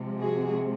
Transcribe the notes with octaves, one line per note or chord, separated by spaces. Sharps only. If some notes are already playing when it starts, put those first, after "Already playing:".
Already playing: C3 F3 G#3
F#4 G#4